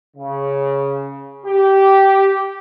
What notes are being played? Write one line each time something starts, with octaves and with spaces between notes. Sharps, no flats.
C#3
G4